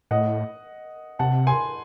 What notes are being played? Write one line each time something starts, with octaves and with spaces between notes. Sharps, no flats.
A2 D#5 F#5
C3 F#5 A5
G#5 C6